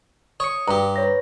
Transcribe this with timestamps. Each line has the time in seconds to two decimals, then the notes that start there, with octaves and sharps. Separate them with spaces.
0.40 C#5 D#6 C#7
0.68 G2 G4 A#5
0.96 B4 C#5 A#6